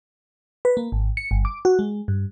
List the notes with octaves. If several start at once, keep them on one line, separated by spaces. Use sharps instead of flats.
B4
A#3
G#1
C#7
G1
D6
F#4
G#3
G2